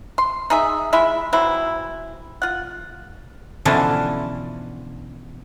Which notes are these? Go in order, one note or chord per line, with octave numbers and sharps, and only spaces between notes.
C6
D#4 G#4 E5
G#3 E4 F4 E5
E3 F#3 C4 E4
F4 F#5
B2 D3 E3 F3 C#4 D4